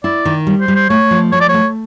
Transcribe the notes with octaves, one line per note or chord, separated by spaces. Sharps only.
E4 D5
D#3
G3
C5
G3
C5
A3 C#5
F3
A3 C#5
D5
C#5
A3